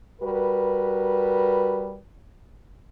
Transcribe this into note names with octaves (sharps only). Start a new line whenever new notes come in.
G3 F#4 A#4 B4